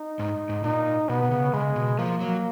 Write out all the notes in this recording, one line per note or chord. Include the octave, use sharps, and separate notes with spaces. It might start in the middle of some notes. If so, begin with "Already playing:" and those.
Already playing: D#4
G#2
G#2
A#2 D#4
B2 B3
B2
C#3
C#3 G#3
B2
F3 A#3
F#3